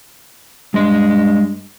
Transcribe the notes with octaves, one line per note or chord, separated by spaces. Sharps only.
G2 G#3 D#5